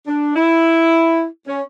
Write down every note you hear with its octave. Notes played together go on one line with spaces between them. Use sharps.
D4
E4
C#4